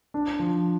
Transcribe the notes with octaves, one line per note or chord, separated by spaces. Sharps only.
D4
F3